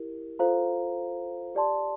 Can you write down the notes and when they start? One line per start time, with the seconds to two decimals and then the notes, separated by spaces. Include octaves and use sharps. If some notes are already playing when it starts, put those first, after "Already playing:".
Already playing: E4 G4 A#4
0.39 F4 A4 C5 F5 A#5
1.55 G4 D5 A5 C6